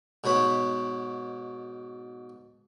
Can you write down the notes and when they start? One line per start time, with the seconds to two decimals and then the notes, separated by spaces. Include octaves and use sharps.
0.24 G#2 B2 C#5 B5